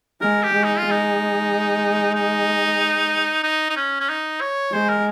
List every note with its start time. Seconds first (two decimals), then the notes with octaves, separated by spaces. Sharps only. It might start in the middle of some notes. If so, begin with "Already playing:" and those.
0.21 G#3 A#4
0.43 G4
0.53 G#3
0.64 D#4
0.78 F4
0.85 G#3
0.91 D#4
2.15 D#4
3.43 D#4
3.70 D#4
3.76 C#4
4.00 C#4
4.09 D#4
4.41 C#5
4.73 G#3 C5
4.89 A#4